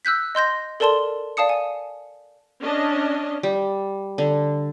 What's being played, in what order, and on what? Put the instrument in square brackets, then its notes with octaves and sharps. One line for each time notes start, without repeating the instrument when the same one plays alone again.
[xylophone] E6 F#6 G6 B6
D#5 C6 G6 A#6
A4 A#4 D5 A5 C6 G7
D5 F5 A5 D#6 C#7
G#5
[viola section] C#4 D4 D#5
[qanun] G3
D3